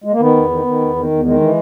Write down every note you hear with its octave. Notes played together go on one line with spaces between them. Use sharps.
G#3
A#3
D#3 B3
E2
D#3
D#3
E2
D#3
E2
D#3 G#3
E3